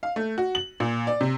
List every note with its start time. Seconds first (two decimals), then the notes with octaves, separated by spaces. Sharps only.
0.03 F5
0.16 A3
0.38 F#4
0.55 F#7
0.80 A#2
1.07 D5
1.21 C3